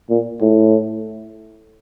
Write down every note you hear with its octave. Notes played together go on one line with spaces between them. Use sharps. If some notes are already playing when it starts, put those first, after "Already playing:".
A#2
A2